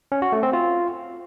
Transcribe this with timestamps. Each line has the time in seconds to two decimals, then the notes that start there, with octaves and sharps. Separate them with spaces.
0.12 C#4
0.22 F#4
0.32 A3
0.43 C4
0.53 F4